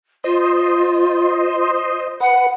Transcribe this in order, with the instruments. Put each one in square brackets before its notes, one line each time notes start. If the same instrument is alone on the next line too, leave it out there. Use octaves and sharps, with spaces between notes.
[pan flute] F4 [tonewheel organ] C5 D#5
[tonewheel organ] B4 [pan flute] F#5